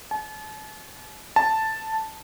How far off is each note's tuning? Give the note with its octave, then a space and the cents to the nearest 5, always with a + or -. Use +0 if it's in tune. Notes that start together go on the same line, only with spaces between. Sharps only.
A5 -40
A5 +0